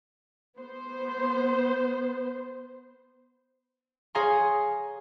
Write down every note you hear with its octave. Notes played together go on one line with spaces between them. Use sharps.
B3 C5
G#4 C#5 F5 G#5 A#5 C6